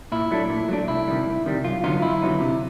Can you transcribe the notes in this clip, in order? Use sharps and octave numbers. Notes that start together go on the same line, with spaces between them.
A#2 E4
F#3 A3 D4
A#2
F#3 A3 D4
C2 E4
C3 D#3 G3
C2
C3 D#3 G3
F#2 F4
D3 F#3 B3 D#4 F4
F#2 E4
D3 F#3 B3 D#4
C3